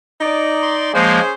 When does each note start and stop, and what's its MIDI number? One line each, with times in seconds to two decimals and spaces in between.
0.20 0.89 63
0.20 0.89 74
0.62 0.92 84
0.94 1.20 53
0.94 1.20 56
0.94 1.20 58
0.94 1.33 61
0.94 1.33 68
0.94 1.33 72